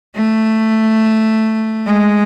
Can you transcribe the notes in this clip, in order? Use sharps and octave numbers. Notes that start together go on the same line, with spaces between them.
A3
G#3